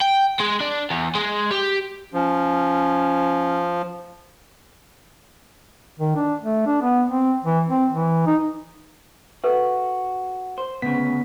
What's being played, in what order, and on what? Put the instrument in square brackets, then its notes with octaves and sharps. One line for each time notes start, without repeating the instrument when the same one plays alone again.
[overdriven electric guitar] G5
G#3
D4
E2
G#3
G4
[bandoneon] F3 [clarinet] C#4
[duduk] D#3
D4
A3
D4
B3
C4
E3
C4
E3
D#4
[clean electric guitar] F#4 [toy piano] A4 B4 E5
[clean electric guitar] C5
[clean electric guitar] D2 C#3 [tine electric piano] B3 B6